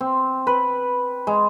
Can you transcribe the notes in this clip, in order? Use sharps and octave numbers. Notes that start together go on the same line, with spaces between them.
C4
B4
G#3